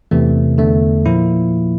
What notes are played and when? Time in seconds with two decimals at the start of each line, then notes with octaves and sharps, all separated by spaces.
0.11 E2 C3 E3 A3
0.58 E2 D3 A3
1.06 A#2 F3 A#3 E4